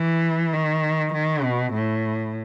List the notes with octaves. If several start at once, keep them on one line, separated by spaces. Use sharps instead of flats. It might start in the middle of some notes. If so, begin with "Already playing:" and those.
Already playing: E3
D#3
D#3
B2
A2